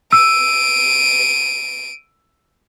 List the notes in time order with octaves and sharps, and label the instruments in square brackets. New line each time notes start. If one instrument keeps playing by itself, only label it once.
[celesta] E6 [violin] D7 D#7